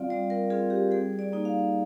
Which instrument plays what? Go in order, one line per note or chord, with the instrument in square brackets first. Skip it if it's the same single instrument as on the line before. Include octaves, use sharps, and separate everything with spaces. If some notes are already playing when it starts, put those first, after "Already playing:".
Already playing: [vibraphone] G3 C4 F4 D5 F5
G3 D5
A#4
C4 F4 G#4
G4
G3 G#4
D5
A#3 D#4
F5